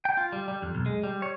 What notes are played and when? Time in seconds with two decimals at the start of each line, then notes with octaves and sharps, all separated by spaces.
0.05 G5
0.17 F4
0.32 G3
0.48 G3
0.62 F2
0.75 B1
0.86 G#3
1.03 G3
1.22 C#5